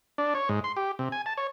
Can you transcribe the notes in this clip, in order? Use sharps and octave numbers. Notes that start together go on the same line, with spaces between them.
D4
C#5
G#2
C6
G4
C3
G#5
A5
C#5